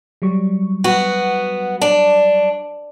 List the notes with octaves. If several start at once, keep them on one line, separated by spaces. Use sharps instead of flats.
F#3 G3 C#6
B3 F#4
D4